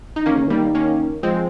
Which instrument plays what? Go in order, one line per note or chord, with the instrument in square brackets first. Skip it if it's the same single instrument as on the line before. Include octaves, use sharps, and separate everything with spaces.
[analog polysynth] D#4
[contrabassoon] D#3 [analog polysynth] A#3 C#4
[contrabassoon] C#3
[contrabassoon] D#3 [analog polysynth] G3 A#3
[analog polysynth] A#3 C#4
[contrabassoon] F3 [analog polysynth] G#3 C4